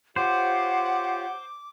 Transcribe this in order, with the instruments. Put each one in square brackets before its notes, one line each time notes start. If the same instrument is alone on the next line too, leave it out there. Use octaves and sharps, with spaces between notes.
[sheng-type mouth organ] F4 G4 C#5 [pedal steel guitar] C5 [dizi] F#5 [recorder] D6